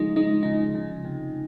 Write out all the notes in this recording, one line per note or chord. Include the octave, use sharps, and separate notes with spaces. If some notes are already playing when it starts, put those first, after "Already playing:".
Already playing: C#3 F3 G#3 D#4 F4
G#3 D#4
C#3 D#4
C#3
C3